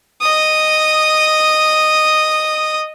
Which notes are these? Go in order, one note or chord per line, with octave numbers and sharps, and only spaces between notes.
D#5 D#6